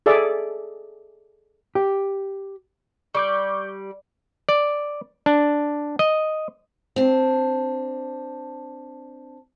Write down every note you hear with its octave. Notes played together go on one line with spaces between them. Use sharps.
G#4 A4 D5 E5
G4
G3 C#6 D6 G6
D5
D4
D#5
C4 D4